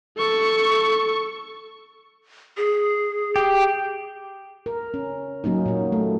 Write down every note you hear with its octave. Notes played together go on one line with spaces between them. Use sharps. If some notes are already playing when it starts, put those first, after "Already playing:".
A4 C#6
G#4
G4
A#4
C#4
F#3 A#3 C#4 D#4
A#2 A#3
A3